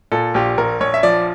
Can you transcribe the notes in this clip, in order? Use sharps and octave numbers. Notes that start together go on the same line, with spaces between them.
A#2 A4
A#1 G4
A#1 A#4
A#1 C#5
E5
F3 D5